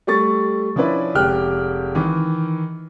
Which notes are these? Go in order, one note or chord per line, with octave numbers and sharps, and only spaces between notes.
G3 A3 C#6 A6
F3 C#4 D4 E4 B4
F1 G#3 G4 G5 F6 F#6
D#3 E3